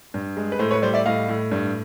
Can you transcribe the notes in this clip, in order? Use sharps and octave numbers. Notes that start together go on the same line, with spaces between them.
G2
G#3
B4
A2 C5
B4 C#5
G3 C5 D5
D5 E5
A2 D#5 F5
A2
G2